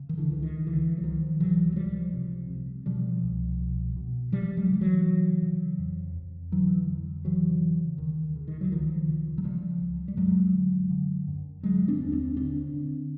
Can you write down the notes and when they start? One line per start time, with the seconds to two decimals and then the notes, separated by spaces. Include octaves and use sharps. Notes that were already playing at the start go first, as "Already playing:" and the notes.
Already playing: C#3
0.09 D#3
0.17 D3 E3
0.30 C#2 E3
0.43 D#3
0.66 C#2 D3 E3
0.98 F#3
1.03 C#2 D#3 F3
1.40 C3 E3 F#3
1.72 F#3
1.76 C#2 F3 G3
2.13 C3
2.50 C3
2.86 B2 F3 G3
3.23 C2
3.60 B2
3.96 B2
4.32 C#3 F3 G3
4.57 F#3 G#3
4.69 C#3 G3
4.81 E3 F#3
5.06 C#3
5.42 C#3
5.79 F2
6.15 F2
6.52 D3 E3 F#3
6.89 F2
7.25 C#3 E3 F#3
7.61 C#3
7.98 D2 D#3
8.35 C#3
8.48 D#3
8.61 F#3
8.72 C#2 D#3 F3
9.08 C#3
9.38 F#3
9.44 C#3 F3 G3
9.81 C#2
10.08 G3
10.17 F#2 F#3 G#3
10.54 D3
10.90 D3
11.28 F#2
11.63 D3 F#3 G#3
11.88 C4 D4
12.00 D#2
12.12 C4 D4
12.37 D3 C4 D4
12.74 D3